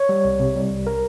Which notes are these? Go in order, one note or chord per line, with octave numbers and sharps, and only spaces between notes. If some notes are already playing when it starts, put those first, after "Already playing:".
Already playing: C#5
G3
C2
C3
G3
C2
A#4